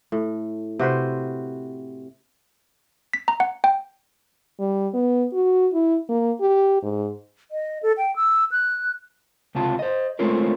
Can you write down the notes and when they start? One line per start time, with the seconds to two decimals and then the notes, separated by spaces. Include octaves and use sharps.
0.12 A2
0.79 C3 F#4 B4 C5
3.13 B6
3.28 A#5
3.40 F#5
3.64 G5
4.60 G3
4.94 B3
5.33 F#4
5.73 E4
6.09 A#3
6.41 G4
6.83 G#2
7.51 D#5
7.83 A4
7.98 G5
8.16 E6
8.52 F#6
9.55 C#2 C3 F4 A5
9.79 C5 D#5
10.19 G#3 A3 C4 C#4 F4 A#4